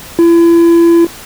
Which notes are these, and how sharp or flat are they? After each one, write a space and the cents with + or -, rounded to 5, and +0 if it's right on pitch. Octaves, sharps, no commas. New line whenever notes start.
E4 +40